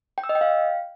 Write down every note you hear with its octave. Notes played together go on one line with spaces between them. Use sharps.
G5
E6
D#5
G5
F5